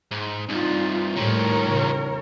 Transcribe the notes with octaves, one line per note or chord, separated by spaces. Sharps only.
G#2
C2 G2 D#4 F4
D#2 A2 D#3 F3 G3 A#4 C#5
E2 C#3